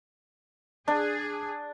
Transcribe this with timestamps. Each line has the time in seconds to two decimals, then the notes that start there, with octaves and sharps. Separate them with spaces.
0.88 D4 G#4